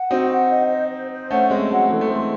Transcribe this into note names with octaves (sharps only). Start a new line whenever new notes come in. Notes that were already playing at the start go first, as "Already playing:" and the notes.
Already playing: F#5
C4 D#4 F#4
F#5
D#5
C5
C5
C5
A3 C#4 F#5
G#3 C4 D#5
F#3 A3 F#5
E3 G#3 A4
A3
G#3 C4 C6